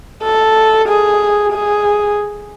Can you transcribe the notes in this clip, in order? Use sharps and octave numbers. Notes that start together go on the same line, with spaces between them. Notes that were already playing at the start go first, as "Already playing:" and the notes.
A4
G#4
G#4